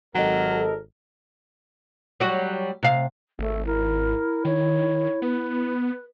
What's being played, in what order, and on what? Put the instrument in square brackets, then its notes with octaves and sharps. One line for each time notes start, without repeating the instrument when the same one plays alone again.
[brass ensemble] G#1 A4 A#4 [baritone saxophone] F#3 [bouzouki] G4 D#5
[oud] F#3 G3 F#4
C3 F5
[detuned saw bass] G#1 [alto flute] A3
[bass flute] E4 [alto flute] A#4
[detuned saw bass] D#3 [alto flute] C#5
[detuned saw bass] B3 [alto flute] B4